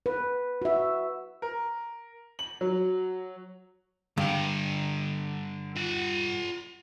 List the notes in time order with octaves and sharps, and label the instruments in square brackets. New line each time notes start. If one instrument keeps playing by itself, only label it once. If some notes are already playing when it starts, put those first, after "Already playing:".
[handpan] B4
F#4 E5
[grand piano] A#4
F#7
F#3
[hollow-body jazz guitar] G2 [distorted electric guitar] D3 G5
[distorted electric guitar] F4 F#5